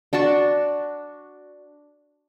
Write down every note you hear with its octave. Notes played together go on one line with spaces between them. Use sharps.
D4 F#4 A5 C#6